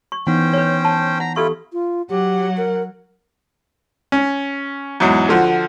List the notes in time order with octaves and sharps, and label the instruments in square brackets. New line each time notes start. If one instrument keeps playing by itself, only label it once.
[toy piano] C#6
[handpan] E3 B3 D#4 [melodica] C#4 C5 G5 [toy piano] F#5
[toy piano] B4 C#5
A5
[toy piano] F#5 [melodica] A#5
[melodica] E4 F4 [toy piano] G4 A4 C#6
[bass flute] F4
[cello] F#3 F#5 [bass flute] G4
[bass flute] A#4
[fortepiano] C#4
E2 G#2 F#3
D3 F3 F#4